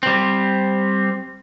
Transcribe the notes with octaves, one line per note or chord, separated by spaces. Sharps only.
G3 C4